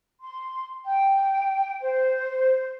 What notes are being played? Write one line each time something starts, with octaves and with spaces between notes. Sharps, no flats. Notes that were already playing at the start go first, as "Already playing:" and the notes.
C6
G5
C5